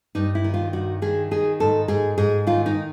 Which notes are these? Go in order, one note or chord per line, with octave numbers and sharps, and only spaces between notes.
G2 D#4
E4
D#3
F4
G2 F#4
D#3 G#4
D#3 G#4
G#2 A4
G#2 G#4
G#2 G#4
D#3 F4
D#4